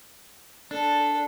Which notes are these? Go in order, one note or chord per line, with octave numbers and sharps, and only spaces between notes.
D4 A4